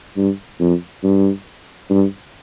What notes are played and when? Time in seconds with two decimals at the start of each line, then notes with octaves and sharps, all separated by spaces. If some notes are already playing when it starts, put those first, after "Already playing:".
0.17 G2
0.60 F2
1.04 G2
1.90 G2